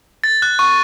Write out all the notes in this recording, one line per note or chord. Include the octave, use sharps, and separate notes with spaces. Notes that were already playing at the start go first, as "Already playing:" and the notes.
A6
F#6
C#6